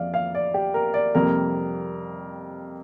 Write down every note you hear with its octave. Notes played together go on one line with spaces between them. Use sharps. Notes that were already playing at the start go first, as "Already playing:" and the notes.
Already playing: F2 F3 D5 F5
F5
D5
G4
A#4
D5
F2 C3 G3 A#3 A#4